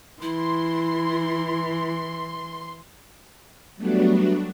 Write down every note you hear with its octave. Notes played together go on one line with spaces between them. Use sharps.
E3 E4 C6
F#3 G3 A3 B3 D4 F#4